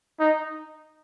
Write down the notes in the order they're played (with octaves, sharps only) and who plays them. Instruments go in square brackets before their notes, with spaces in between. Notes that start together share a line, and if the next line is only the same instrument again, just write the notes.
[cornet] D#4